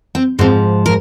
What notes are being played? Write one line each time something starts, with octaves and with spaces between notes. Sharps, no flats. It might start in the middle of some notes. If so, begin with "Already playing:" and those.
C4
G#2 F3 C4
A#4